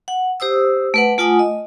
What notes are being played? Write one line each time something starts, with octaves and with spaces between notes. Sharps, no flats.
F#5
G4 C5 D#6 E6
A3 B4 F#5
A3 F4 F#5 G#5 D#6
D#5